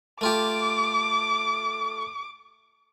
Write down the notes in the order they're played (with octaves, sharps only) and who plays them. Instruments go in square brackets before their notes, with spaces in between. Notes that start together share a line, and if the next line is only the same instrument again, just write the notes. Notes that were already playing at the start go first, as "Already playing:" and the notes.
[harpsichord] A3 F4 G4 [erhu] D6